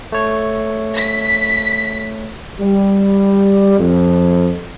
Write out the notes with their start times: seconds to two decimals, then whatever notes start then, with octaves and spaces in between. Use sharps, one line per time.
0.12 A3 C#5
0.97 B6
2.60 G3
3.78 F2